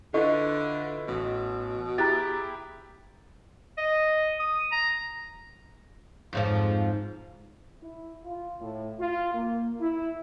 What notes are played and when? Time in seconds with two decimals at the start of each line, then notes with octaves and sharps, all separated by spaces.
0.14 D3 E4 F4 A4 B4 D#5 C#6
1.08 A1 B2
1.98 E4 G4 G#4 A#5 F#6 A6
3.77 D#5
4.39 D#6
4.72 A#5
6.33 F2 G#2 F3
7.82 E4
8.24 F4
8.61 A2
9.00 F4
9.35 A#3
9.81 E4